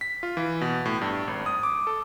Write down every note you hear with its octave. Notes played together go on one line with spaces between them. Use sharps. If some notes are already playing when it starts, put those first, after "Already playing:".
B6
F4
E3
B2
A2
G2
G#1
D#6
D6
A4